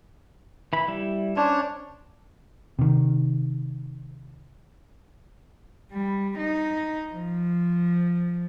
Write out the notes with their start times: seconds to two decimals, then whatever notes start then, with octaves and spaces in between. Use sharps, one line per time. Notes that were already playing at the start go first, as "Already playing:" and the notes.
0.73 E3 B5
0.88 G3 E4
1.37 C#4 D4 C5 C#5
2.79 C3 D#3
5.92 G3
6.38 D#4
7.13 F3